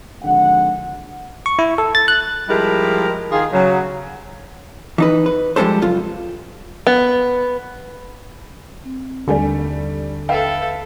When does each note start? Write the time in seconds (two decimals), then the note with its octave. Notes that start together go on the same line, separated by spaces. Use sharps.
0.22 G#1 D3 F3 G#3 F#5
1.46 C#6
1.59 E4
1.78 A4
1.95 A6
2.08 F#6
2.49 F3 G3 G#3 E4 G4 A#4
3.31 D#3 F4 G#4
3.53 C#3 F#3
4.98 E3 D#4 B4
5.26 B4
5.56 F3 G3 G#3 D4 A4 C5
5.82 C#2 F#2 F4
6.87 B3
8.85 C4
9.28 D#2 D3 G3 A3 A4 G#5
10.29 A4 B4 E5 F5 G5